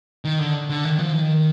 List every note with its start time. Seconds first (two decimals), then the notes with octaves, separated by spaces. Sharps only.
0.25 D#3
0.39 D3
0.69 D3
0.85 D#3
1.00 F3
1.13 D#3